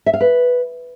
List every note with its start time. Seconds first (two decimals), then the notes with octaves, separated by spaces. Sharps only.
0.06 E5
0.13 F5
0.21 B4